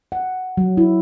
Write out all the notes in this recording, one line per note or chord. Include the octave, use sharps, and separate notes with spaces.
F#5
F#3
E4